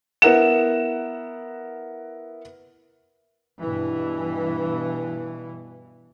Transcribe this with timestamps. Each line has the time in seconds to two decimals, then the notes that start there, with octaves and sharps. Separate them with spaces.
0.22 B3 E4 A#4 F#5 E7
3.60 G2 B2 E3